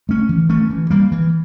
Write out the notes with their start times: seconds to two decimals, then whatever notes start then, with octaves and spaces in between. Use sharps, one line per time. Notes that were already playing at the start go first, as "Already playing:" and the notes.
0.09 A3 C#4
0.29 E3
0.49 A3 C#4
0.70 E3
0.90 G3 A#3
1.12 E3